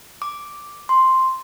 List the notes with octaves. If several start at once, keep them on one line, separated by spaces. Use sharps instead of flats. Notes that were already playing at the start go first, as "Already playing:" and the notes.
D6
C6